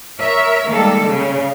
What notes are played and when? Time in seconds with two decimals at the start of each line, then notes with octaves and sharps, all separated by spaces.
0.19 A#4 C#5 E5
0.69 D#3 G3 G#3 A#3 A4
1.05 C#3